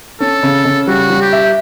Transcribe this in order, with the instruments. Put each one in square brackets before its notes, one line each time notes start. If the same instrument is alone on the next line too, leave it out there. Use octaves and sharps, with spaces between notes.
[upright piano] C#4 [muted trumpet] A4
[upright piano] C#3
C#3
[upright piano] G3 [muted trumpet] F#4
[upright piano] G3
[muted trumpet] G4
[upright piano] E5